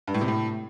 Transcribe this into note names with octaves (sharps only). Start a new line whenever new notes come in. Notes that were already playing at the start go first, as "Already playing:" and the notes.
G2
A2
C3
A2